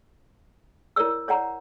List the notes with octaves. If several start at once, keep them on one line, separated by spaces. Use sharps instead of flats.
E4 A#4 C#5 D5 E6
C#5 D5 F#5 A#5